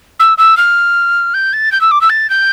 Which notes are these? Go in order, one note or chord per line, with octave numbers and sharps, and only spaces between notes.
E6
E6
F6
G6
A6
G6
E6
D6
E6
A6
G6